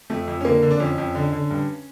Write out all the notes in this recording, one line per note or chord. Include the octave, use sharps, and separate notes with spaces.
F2 A3
F2
C#4
D3 A#3
D3
D4
F2 C#4
F2
D3
D3
G2